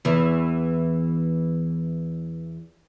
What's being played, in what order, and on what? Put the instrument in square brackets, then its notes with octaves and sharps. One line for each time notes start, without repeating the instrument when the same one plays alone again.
[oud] E2 E3